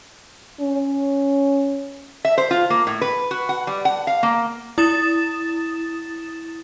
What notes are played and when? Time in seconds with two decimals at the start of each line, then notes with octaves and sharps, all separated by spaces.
0.61 C#4
2.25 E5
2.38 C5
2.51 F4
2.70 A#3
2.87 A2
3.01 B4
3.31 F#4
3.49 F#5
3.67 G3
3.85 F#5
4.07 F5
4.23 A#3
4.78 E4 D#6 A6 E7